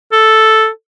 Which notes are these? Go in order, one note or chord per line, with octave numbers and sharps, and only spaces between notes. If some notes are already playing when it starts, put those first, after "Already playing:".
A4